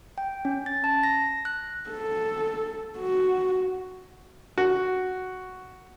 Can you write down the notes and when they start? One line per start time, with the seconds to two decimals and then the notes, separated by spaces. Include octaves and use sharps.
0.18 G5
0.45 C#4
0.66 A6
0.84 A5
1.03 A#6
1.45 F#6
1.90 A4
2.98 F#4
4.58 F#4